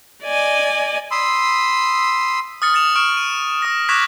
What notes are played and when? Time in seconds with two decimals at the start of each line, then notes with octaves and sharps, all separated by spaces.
0.23 D5 D#5 G#5
1.11 B5 C6 D#6 E6
2.62 D#6 F6 A6 C#7
2.74 A6 C#7 E7 F7
2.96 C#6 F6 D7
3.17 D#7
3.62 D#6 A#6
3.89 C#6 D6 F#6 G#6 A#6 B6